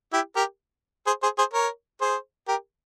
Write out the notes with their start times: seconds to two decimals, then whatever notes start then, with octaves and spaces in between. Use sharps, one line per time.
0.13 E4 G4
0.36 G4 A#4
1.06 G#4 C5
1.23 G#4 C5
1.38 G#4 C5
1.53 A#4 C#5
2.01 G#4 C5
2.48 G4 A#4